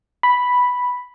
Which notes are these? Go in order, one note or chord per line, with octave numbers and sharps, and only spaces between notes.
B5